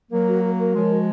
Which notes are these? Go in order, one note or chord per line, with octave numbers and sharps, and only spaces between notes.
F#3 A#3 A#4
F#4
F#4
A#4
F3 G#3 C#5
F#4